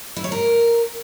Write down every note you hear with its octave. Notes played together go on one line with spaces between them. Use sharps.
E4
C#5
A#4